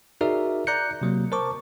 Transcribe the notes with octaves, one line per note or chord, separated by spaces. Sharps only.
D#4 F#4 G#4 A#4 D5 E5
D5 A#5 F#6 G6 C#7
C3 F#3 A#3
A#4 C5 A5 C#6 D6